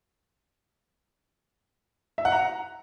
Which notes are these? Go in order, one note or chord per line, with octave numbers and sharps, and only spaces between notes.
E5
F#5
A#5